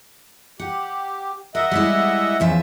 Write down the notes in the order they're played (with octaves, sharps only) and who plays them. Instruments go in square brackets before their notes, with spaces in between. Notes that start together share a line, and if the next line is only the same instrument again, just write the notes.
[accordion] G4 [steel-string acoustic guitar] F#5
[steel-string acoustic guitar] A#4 [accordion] D#5 E5 F#5
[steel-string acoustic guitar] G3 G#3 E4
[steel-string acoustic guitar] E2 F3 E5 [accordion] C#3 G#3